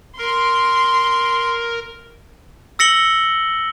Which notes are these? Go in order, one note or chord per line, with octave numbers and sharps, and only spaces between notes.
A#4 C6
E6 A#6 C#7 F#7 G7